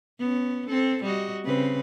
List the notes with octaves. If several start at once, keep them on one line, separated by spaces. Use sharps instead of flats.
B3 C#4
C4 A4
G3 F#4 D#5
C#3 C4 B4